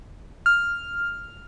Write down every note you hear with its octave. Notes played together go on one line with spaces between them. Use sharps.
F6